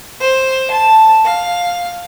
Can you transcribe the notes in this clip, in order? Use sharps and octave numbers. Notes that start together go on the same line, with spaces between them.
C5
A5
F5